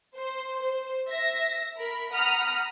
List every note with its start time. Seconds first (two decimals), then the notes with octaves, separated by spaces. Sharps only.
0.15 C5
0.60 C5
1.09 E5 A#6
1.77 A#4 B5
2.13 F#5 A#5 B5 D#6 F6